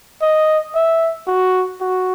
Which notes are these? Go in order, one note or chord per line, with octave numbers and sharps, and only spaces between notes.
D#5
E5
F#4
F#4